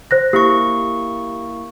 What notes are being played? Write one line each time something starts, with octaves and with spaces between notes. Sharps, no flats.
C5 F#6 A#6
A#3 E4 G4 C#6